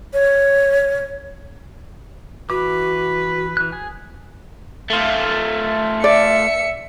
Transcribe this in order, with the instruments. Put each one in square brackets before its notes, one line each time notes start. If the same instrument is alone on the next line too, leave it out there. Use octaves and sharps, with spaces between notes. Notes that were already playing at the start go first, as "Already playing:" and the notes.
[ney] C#5
[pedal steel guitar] E3 D6 [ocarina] F#4 [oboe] B4
[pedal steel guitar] E3 F#6
G#4 G#5
[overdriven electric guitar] A3 F4
[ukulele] D5 [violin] E5 C#7